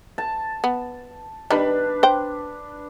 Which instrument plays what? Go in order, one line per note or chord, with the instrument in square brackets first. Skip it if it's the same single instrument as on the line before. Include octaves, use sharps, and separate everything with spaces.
[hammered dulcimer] A5
[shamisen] B3
[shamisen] D#3 G3 [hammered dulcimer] D4 B4
[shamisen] C5 G5